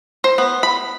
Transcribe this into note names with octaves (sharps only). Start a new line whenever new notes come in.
C5
B3
B5